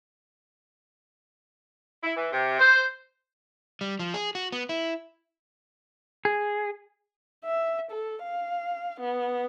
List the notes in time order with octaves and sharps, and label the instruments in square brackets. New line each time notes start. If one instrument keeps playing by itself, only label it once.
[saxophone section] E4
E3
C3
C5
[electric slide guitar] G3
F3
G#4
F#4
B3
E4
G#4
[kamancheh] E5
A4
F5
B3